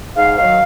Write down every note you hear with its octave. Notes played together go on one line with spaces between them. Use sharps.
G#2 F5
D#3 F#3 F5